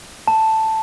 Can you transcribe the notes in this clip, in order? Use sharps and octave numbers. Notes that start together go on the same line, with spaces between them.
A5